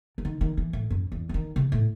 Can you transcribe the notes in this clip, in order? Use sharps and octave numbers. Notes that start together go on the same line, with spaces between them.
E3
D#3
D#3
E3
A2
F#2
E2
E3
D#3
C3
A2